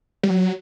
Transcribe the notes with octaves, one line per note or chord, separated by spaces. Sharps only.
G3
F#3